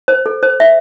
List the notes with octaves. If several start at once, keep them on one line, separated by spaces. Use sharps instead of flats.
C5
A4
C5
E5